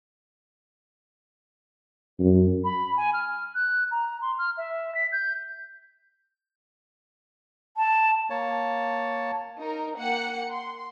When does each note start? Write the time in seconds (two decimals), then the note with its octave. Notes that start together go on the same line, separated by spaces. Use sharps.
2.20 F#2
2.64 B5
2.97 G#5
3.14 F6
3.55 F#6
3.91 A#5
4.22 C6
4.39 F6
4.57 E5
4.95 B6
5.12 G6
7.77 A5
8.30 A#3 C#5 A5
9.59 D#4 A#4
9.98 A#3 F#5 G5 C#7
10.49 C6